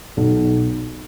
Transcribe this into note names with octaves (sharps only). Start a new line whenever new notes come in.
B1